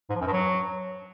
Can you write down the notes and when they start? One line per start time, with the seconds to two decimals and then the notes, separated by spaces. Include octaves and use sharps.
0.10 G#2
0.15 F3
0.21 F#2
0.27 G2
0.33 F#3